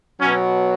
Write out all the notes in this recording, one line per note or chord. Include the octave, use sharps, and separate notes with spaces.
B2 F#3 C#4